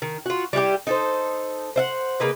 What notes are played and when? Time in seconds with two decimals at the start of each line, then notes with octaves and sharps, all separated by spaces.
0.02 D#3
0.26 F4 F#4
0.53 G3 E4 F#4 G4
0.87 D#4 A4 C5
1.76 C5 E5 F#5
2.20 C#3 A#3 B4 D#5